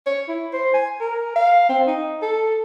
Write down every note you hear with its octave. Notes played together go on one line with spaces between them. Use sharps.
C#5
E4
C5
G#5
A#4
F5
C4
D#4
A4